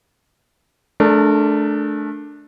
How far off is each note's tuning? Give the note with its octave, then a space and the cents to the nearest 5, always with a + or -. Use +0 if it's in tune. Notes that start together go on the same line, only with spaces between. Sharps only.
A3 -25 D4 +0 A#4 -30